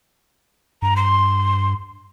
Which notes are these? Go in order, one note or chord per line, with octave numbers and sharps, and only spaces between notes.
G2 A#5
C6